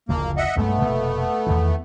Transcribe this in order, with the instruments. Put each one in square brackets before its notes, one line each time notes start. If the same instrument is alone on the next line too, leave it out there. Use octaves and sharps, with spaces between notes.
[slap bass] F#1 D2 F3 [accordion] A#3
[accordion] D#5 E5 F#5
[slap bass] B1 G2 G#3 [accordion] A3 B3
[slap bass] F1 B2 A#3
E2 D#3 E3